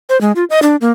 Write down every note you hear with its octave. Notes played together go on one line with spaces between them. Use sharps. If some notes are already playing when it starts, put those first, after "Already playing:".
C5
G#3
F4
D#5
D4
A#3